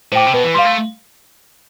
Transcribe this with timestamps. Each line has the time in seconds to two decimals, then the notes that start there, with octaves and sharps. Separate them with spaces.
0.12 A2 C5 G5 D6
0.27 C3
0.34 B2 B4
0.44 E3
0.54 G3 F5 C6
0.65 A3